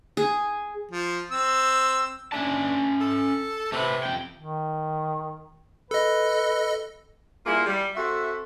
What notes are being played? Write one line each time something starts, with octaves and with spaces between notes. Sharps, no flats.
G#4
F3
C4 E6
C#4 D4 E5 A5
A4
C3 A3 B4
F2 A#3 G5
D#3
A4 B4 D#5
G3 A#3 E4 F4 G#4
G3
C4 F#4 A4 E5